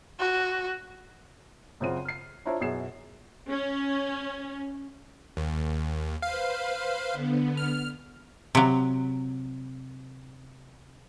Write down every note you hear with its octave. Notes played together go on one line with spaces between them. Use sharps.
F#4
F#2 C#3 C4 F4 F#5 D#7
F6 C7
D4 E4 F4 C5 C#5 A#5
F#2 B2 E4 G#4 C7 E7
C#4
D#2
B4 C5 F5
D3 B3
F6
C3 F#3